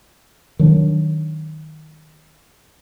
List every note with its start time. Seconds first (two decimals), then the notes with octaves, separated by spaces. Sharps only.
0.59 D#3 F#3 D4